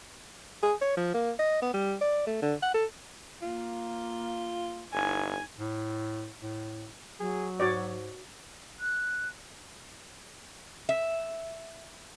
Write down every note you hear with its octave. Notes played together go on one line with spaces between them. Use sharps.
G#4
C#5
F3
A#3
D#5
B3
G3
D5
A3
D3
F#5
A4
A#3 F4
G1 D#4 G#5
A2
A2
F#3 G#4
G#2 F#4 C#5 D5
F#6
E5